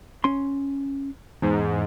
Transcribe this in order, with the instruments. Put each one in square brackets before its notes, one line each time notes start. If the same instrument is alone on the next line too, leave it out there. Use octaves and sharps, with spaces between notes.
[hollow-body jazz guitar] C#4 C6
[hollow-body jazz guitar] E2 [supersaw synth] G#2